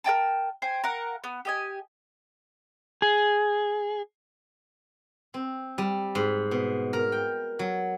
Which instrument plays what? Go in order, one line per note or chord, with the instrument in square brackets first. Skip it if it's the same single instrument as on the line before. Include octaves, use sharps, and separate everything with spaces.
[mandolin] A#4 D5 G5 A5
C5 G5 G#5
A#4 F5 F#5
B3
G4 D#5 G#5
[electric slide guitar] G#4
[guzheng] C4
G3
G#2
B2
A#4
G5
F#3